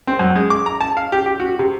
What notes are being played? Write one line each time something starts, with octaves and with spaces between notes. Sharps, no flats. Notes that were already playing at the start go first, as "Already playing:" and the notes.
C4
F#2
G#3
D6
A#5
A5
F5
G4
G4
F#4
C3